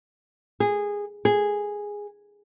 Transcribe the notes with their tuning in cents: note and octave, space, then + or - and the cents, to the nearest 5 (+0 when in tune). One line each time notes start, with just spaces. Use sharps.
G#4 -15
G#4 -5